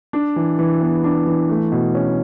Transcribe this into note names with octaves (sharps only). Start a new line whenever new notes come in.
D4
E3
E3
B3
D4
E3
A3
B2
C#4